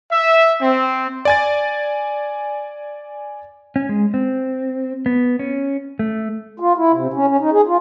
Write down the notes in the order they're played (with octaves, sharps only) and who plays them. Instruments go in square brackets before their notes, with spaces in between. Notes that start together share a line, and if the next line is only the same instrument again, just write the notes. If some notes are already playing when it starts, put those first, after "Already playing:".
[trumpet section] E5
C4
[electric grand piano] D5 G#5 A6
[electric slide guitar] C#4
G#3
C4
B3
C#4
A3
[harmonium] F4
E4
C3
C#4
C#4
D#4
G#4
F4